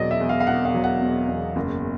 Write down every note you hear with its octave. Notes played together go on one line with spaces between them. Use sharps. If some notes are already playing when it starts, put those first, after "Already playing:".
Already playing: E1 B2 F#3 D5 D#5
E5
E2
F5
F5
E1 F#5
F5
F#3
F#5
B2
E2
F#1